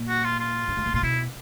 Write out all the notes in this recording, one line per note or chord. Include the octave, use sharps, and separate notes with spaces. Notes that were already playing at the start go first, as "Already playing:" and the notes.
Already playing: A#2
F#4
F4
F4
G2
G#2
A2
A#2 F4
B2 E4